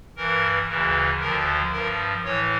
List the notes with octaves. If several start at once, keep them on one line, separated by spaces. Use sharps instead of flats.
G2 E3 A#4
D2 C#3 E3
D2 D3 F3 A#4
G2 F3 A#4
A2 E3 C#5